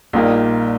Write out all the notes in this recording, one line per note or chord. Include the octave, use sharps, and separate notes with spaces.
A#1 A#2 G3 A#3 D#4